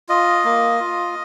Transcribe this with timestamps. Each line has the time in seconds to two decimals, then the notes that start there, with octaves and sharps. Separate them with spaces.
0.09 F4 D#5
0.45 A#3
0.80 F4